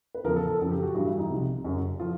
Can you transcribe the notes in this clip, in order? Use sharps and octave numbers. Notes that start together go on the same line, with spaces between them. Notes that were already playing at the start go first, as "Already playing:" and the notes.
B4
E2 C#3 F3 A#4
A4
A4
F#2 C#3 F3 A4
G4
F#4
G2 E3 G3 F#4
E4
D#4
C2 C3 F3
F#2 C#3 F#3
F3 F4